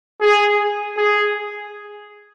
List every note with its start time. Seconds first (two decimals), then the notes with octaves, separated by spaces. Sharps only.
0.21 G#4
0.97 G#4